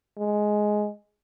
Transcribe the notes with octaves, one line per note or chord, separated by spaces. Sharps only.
G#3